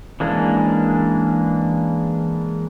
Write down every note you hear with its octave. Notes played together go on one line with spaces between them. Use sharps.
E3 G#3 A#3 C#4 D4